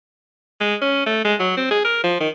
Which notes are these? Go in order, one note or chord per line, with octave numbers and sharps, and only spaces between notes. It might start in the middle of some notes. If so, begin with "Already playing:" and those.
G#3
C#4
A3
G#3
F#3
C4
G#4
A#4
F3
D#3